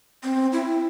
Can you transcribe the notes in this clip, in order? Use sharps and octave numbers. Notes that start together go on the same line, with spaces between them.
C4
E4